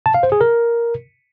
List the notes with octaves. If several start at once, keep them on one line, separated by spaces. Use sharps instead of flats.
A5
F5
C5
G#4
A#4